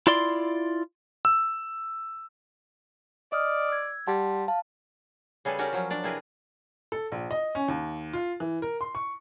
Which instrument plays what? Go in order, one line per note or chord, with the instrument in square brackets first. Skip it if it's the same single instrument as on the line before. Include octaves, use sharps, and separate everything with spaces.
[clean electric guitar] E4 F4 D5 C6
[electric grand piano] E6
[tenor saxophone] D5 [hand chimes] D#5 D#6 F6
[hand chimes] E6 G#6
[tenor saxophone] G3 [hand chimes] F#5 A5 C6
[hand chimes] F5 A5
[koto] C#3 G3 G#4 A4 B4
C#4 F#4 G4 A#4 B4 D5
F3 F#3 C#4
D4 D5
C3 C4 E4 G#4 A#4 B4
[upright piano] A4
A#1
D#5
C#4
D#2
F4
E3
A#4
C6
C#6